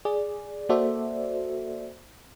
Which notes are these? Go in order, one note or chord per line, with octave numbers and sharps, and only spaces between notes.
G#4 D5
A#3 F#4 A4 C5 D5 E5